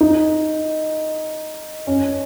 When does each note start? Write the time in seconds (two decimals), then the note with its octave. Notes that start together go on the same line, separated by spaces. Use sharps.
0.01 D#4
1.87 C#4